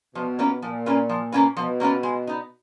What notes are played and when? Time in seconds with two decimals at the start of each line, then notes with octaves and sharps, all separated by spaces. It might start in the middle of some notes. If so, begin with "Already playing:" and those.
0.15 B2 F3
0.39 A#3 C#4 F4 B4
0.62 A#2 F3
0.86 A#3 C#4 F4 B4
1.09 F3
1.32 A#3 C#4 F4 B4
1.57 B2 F3
1.80 A#3 C#4 F4 B4
2.03 G#3
2.27 B3 D#4